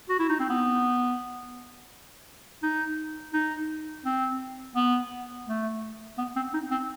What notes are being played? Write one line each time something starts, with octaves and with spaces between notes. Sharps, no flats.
F#4
E4
D#4
C4
B3
D#4
D#4
C4
B3
A3
B3
C4
D#4
C4